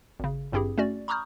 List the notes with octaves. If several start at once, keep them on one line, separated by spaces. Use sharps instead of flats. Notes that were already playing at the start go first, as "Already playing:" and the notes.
G#1 C#3
G#1 G2 C4 E4 G4 G#4
A3 C#4 F#4 D5
A#5 B5 C#6 D#6 F6 G6